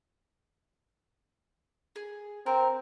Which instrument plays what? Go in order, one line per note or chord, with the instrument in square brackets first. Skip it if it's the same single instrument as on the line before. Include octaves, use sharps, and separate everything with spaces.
[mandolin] G#4
[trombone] C4 [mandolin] A#4